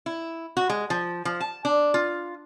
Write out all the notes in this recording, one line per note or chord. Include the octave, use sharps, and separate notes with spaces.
E4
F#4
G#3
F3
F3
A5
D4
F4